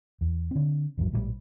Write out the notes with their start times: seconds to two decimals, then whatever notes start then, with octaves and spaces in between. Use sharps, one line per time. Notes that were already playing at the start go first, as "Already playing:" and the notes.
0.21 E2
0.51 D3 C4
0.97 G#1 E2 G2 F#3
1.11 A#1 A2 F3 G3